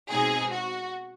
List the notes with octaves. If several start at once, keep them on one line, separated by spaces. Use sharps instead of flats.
B2 G#3 C4 D#4 G#4
F#4